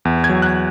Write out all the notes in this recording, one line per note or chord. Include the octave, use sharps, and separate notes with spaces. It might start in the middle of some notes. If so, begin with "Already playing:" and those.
E2
G#6
F#3
F#6